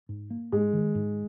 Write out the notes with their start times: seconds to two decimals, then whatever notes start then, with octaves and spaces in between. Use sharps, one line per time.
0.09 G#2
0.30 A#3
0.52 G#2 G#3
0.73 D#3
0.95 G#2